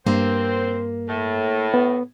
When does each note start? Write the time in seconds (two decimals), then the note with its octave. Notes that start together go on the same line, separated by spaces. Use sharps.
0.07 G2 A#3 C4 C5
1.09 A2
1.74 B3